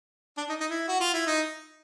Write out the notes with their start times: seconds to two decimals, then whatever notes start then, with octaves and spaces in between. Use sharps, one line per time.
0.37 D4
0.49 D#4
0.60 D#4
0.70 E4
0.88 F#4
1.00 F4
1.13 E4
1.27 D#4